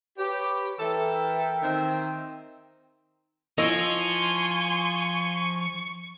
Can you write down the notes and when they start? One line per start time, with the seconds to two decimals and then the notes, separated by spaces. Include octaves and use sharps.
0.18 G4 B4 C#5
0.79 E3 A4 A#4 E5 G5
1.62 D#3 C4
3.58 F3 E4 D#5 G#5 C6 C#6